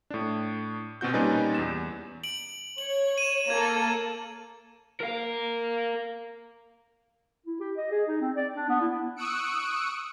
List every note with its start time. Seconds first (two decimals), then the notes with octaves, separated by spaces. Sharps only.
0.10 A2 D4
1.01 B2 C4 F#4 G6
1.13 A#2 G3 C#4 D#4 B4 G#5
1.55 E2 E7
2.24 D7 F#7
2.78 C#5 F#7
3.18 D#7 E7
3.50 A#3 A4 G#6
5.00 A#4 F5
7.46 E4
7.60 G4
7.77 D#5
7.91 G#4
8.07 D#4
8.21 C4
8.35 D5
8.55 D4
8.69 B3
8.81 E4
9.16 C#6 D#6 E6 F#6 C#7 D7